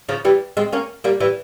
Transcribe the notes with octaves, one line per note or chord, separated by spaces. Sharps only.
C#3 F3
E3 G3
G#3 C4
A#3 C#4
G3 A#3
E3 G3